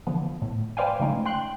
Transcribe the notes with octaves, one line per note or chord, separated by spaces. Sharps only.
D3 E3 F3 B3
A2
B4 C5 D5 F5 G5 G#5
C#3 F3 G#3 A3 C#4 D#4
G5 C6 F#6